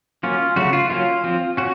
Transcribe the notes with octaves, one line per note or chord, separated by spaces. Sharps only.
F#3 A#3 C#4 F4
C#3 F#3 A3 F#4
F4
F#3 A#3 C#4 F4
F3 C4
C#4 F#4